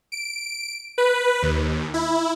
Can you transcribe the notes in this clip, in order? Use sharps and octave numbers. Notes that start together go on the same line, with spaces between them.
D7
B4
D#2
E4